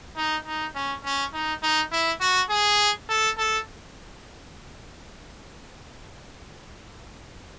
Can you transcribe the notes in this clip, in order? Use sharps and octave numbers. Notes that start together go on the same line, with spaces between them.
D#4
D#4
C#4
C#4
D#4
D#4
E4
F#4
G#4
A4
A4